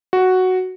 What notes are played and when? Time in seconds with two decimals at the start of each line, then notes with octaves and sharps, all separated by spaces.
0.13 F#4